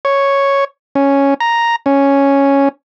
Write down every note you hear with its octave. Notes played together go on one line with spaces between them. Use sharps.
C#5
C#4
A#5
C#4